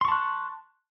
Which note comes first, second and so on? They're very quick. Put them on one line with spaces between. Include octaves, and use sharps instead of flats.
C6 C#6 A5 F#6